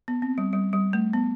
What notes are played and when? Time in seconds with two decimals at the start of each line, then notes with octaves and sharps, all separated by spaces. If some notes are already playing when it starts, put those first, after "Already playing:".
0.08 B3
0.22 C4
0.38 G3
0.53 G3
0.73 G3
0.93 A3
1.13 B3